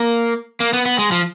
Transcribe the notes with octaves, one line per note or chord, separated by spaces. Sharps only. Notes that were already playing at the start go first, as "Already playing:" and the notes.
Already playing: A#3
A#3
B3
B3
G#3
F3